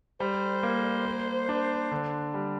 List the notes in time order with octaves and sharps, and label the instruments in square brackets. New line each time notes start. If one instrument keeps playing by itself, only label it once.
[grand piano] G3 [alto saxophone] C5
[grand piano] A#3
A#3
D4
D3
G3